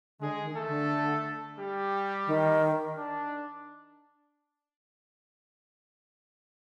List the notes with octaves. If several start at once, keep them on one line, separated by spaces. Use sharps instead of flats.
D3 G#3 G#4
D#3
A3 A4
D3
G3 G4
D#3
D4